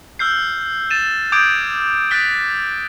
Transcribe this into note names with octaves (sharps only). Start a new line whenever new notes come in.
E6 F6 G6 C7
A6 D#7 E7
D6 D#6 G6 G#6 D7
D#6 F#6 A6 B6 D7 G7